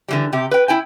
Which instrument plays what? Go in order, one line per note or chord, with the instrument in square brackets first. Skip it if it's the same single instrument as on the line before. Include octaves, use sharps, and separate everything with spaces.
[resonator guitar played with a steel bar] D3 E3 G3
C3 G4
B4 G5
E4 G5 G#5